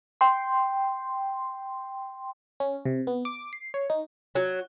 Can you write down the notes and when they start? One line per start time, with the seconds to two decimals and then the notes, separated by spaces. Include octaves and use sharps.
0.21 G5 C6
2.60 C#4
2.85 C3
3.07 B3
3.25 D6
3.53 C7
3.74 C#5
3.90 D#4
4.35 F#3